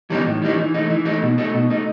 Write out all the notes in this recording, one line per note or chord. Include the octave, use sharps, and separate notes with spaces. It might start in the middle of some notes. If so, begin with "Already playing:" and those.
E3 G3 B3 D#4
A2
E3 G3 B3 D#4
E3
A3 D#4
E3
A3 D#4
B2
A3 D#4
B2
A3 D#4